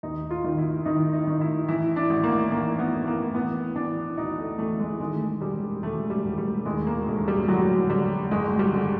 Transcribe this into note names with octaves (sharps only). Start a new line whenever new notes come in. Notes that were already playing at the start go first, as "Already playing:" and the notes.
D#2 D#4
F4
D#3
E4
D#3 D#4
D#4
D#3
E4
E3 E4
D4
A1
A#3
E3 A#3
B3
A2
A#3
E3 B3
E3 D4
D2 D#4
A3
E3 A3
G#3
D#3 G#3
E1 G3
E1 A3
G3
E1
G3
D#2 G#3
A#3
E1 A3
G3
D3 F#3
D3 G3
G1 G#3
G3
D3